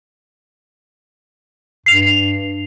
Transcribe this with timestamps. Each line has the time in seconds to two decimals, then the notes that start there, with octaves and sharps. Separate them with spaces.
1.86 G2 C7 F7